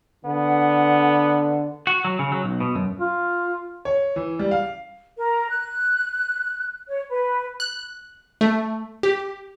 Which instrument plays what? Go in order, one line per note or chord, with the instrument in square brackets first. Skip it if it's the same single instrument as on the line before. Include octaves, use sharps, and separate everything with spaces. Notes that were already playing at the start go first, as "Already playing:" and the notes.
[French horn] D3 [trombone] B3
[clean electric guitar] F#4
F#3
C#3
F#3
B1
B2
F#2
[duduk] F4
[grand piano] C#5
E3
G3
F5
[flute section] A#4
F#6
C#5
B4
[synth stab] F#6
A3
G4